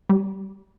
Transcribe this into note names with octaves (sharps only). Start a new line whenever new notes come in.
G3